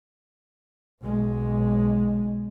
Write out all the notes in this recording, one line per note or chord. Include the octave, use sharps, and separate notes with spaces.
B1 G#3